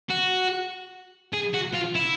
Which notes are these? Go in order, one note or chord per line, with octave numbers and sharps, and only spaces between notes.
F#4
G#4
F#4
F4
E4